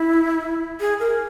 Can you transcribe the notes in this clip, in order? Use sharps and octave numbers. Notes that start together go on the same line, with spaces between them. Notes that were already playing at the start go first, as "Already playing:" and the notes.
Already playing: E4
G#4
A#4